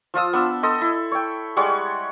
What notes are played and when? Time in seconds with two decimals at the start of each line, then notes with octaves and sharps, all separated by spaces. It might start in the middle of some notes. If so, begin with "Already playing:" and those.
0.14 F3 F4 D#6 E6
0.33 B3 D4 E6
0.63 A4 D#5 C6 D#6
0.81 E4
1.11 C#5 G5
1.56 G3 G#3 C#5 F#5